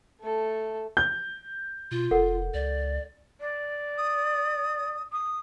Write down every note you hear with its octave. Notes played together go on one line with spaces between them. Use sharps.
A3 A4
G6
B2 F4
F1 A4 A#4 F#5
C#2 D5
D5
D#6
D#6